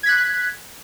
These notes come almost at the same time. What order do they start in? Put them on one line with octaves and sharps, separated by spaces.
G#6 B6 F#6